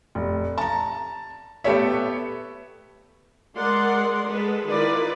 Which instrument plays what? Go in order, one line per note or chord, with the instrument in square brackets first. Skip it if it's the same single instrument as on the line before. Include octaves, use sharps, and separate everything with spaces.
[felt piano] F1
A5 A#5
A3 B3 G4 A4 C#5 E5
[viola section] G#3 G#4 A#4 D5 F#5 C6
G#3 A4 B4
D#3 E4 F4 B4 D5